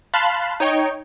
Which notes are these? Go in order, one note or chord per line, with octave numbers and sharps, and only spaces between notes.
F5 A5 B5 C6 F#6
D#4 C#5 G5